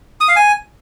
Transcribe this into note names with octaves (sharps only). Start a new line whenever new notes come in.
D#6
F5
G#5